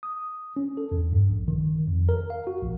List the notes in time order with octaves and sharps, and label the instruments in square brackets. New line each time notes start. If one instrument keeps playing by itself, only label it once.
[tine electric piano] D#6
C#4
A4
E2
G2
A#1
D#3
F2
A#4
F5
F#4
A#1